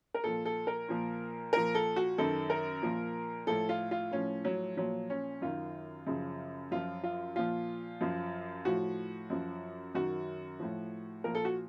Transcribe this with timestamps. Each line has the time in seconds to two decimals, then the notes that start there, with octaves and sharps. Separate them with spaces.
0.14 A#4
0.24 A#2 F3 A4
0.45 A4
0.67 A#4
0.88 A#2 F3
1.53 A#2 F3 A#4
1.75 A4
1.96 F#4
2.18 F#2 D#3 A4
2.50 A#4
2.82 A#2 F3
3.47 A2 F3 A4
3.69 F4
3.91 F4
4.12 A2 F3 C#4
4.45 F#3
4.77 A#2 F3 F#3
5.10 C#4
5.42 F#2 D#3 F4
6.07 F#2 C#3 F3
6.71 F#2 F3 F4
7.03 F4
7.36 A#2 F3 F4
8.01 F#2 F3
8.65 A2 F3 F#4
9.30 F#2 F3
9.95 F#2 D#3 F#4
10.60 A2 F3
11.24 A#2 F3 A#4
11.35 A4
11.45 F#4